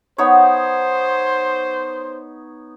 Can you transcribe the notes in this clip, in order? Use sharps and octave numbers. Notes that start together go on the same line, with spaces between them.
B3 D#4 C5 C#5